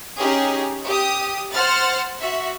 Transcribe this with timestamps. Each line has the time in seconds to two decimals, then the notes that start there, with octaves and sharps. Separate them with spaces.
0.19 C#4 D#4 G4 G#4
0.87 G4 D#6
1.53 C5 F#5 F6 A6
2.21 F#4 E5